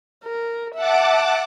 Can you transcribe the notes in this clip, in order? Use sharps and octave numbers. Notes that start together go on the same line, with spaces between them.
A#4
E5 F#5 A5 D6